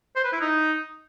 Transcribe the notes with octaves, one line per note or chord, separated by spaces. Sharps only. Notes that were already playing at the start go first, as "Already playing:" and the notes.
C5
B4
E4
D#4